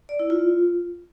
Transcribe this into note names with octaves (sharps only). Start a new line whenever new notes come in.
D5
E4
F4